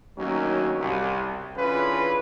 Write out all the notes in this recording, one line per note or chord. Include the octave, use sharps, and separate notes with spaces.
D2 D#3 F#3 A#3 C#4 D#4
C2
D3 E3 C#4 F4 G#4 B4